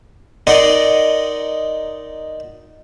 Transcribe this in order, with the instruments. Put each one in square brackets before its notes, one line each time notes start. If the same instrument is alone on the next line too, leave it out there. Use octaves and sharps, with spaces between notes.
[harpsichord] D#4 A#4 D5 D#5 F#5 C6